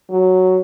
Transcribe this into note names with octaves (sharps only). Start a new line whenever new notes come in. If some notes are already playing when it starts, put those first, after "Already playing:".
F#3